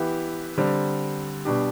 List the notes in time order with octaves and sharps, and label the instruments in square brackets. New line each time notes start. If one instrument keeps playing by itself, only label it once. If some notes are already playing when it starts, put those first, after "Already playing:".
Already playing: [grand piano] E3 B3 E4 G4
D3 G3 C4
B2 G3 D4 G4